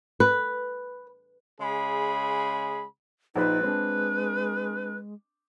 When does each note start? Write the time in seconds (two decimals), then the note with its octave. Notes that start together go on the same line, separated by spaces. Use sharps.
0.20 B4
1.61 C#3 G#3 G#4 B5
3.36 A#1 D#4 B4 C5 B5
3.63 G#3 C4 D4